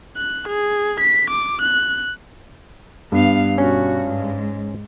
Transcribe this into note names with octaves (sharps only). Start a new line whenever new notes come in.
F#6
G#4
B6
D6
F#6
G2 B3 F5
B2 C#4 F#4
G#2 G#3